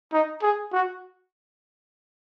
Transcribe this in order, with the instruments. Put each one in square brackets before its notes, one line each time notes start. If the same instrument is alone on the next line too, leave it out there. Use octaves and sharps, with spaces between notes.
[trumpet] D#4
G#4
F#4